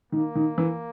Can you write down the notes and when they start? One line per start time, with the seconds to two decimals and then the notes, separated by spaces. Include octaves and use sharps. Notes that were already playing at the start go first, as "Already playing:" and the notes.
0.12 D#3 A#3
0.35 D#3
0.58 E3